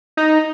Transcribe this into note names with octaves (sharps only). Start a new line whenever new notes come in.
D#4